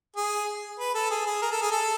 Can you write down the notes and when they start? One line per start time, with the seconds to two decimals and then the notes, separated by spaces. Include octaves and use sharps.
0.16 G#4
0.80 B4
0.95 A4
1.11 G#4
1.26 G#4
1.42 A#4
1.52 A4
1.62 G#4
1.72 A4